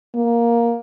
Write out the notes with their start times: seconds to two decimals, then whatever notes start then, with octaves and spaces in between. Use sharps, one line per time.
0.15 A#3